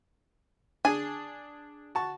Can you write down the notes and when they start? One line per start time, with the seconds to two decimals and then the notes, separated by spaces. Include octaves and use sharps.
0.85 D4 G#4 G#5
1.95 F#4 A5 C#6